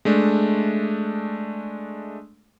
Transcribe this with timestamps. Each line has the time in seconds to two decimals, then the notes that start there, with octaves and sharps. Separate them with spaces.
0.05 G#3 A3 D4